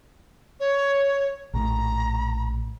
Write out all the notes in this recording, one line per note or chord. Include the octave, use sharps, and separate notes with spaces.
C#5
A#1 A2 A#5